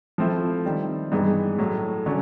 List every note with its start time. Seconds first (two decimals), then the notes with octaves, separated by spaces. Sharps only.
0.18 F3 A3 C4 E4
0.65 D#3 G3 C4
1.12 G2 E3 G#3 B3 D#4
1.58 A2 F#3 A3
2.06 D3 F#3 A3 C#4